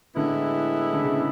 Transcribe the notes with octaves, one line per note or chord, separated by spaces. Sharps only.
A2 D3 G#3 B3 E4
D3
C#3